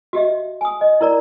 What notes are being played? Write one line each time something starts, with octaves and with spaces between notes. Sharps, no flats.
F#4 G4 D#5 E5
G#5 D#6
D#5
E4 A#4 D5 A#5